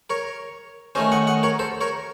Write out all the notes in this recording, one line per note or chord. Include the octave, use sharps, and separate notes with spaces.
A#4 C#5
D#3 A3 C#4 C5 D#5
D#5 F#5
D#5 F#5
A#4 C#5
A4 C5
A#4 C#5